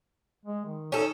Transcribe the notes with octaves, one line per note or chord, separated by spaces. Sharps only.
G#3
D#3
C#4 D#4 A4